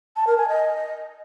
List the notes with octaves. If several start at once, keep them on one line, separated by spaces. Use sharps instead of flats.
A5
A#4
G#5
D#5